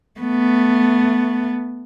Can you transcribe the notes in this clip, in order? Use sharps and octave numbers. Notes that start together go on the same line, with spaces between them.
A3 B3